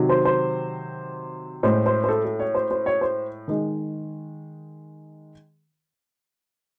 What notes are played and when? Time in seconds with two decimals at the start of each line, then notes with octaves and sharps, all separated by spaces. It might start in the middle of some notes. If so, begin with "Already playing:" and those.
Already playing: C3 D#3 F#3
0.09 C5
0.25 C5
1.63 A2 G#3 C5
1.86 C5
2.04 C5
2.09 A4
2.25 A4
2.39 C#5
2.54 C5
2.71 C5
2.86 C#5
3.01 C5
3.48 D#3 G#3